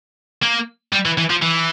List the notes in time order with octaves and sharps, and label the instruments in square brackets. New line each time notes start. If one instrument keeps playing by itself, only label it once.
[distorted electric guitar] A#3
G3
E3
E3
F3
E3